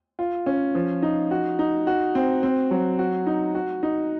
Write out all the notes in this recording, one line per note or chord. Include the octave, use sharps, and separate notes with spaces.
F4
C#4
F3
D#4
F#4
D#4
F#4
C4
C4
F#3
F#4
D#4
F#4
D#4